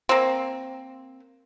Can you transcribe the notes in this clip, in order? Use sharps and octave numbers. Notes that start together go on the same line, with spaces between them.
A#3 C4